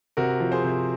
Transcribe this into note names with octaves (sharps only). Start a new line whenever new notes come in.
C3 F#4 A#4
F3
G#4 C5
C3